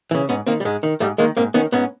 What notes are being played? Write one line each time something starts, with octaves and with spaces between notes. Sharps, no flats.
C#3 E3
G#2 B3 C#4
D#3 A#3 C4
G3
G#2 G#3
D#3
G#2 G3 A3
D#3 G#3 A#3
G#2 A#3 C4
D#3 B3 C#4
G#2 B3 C#4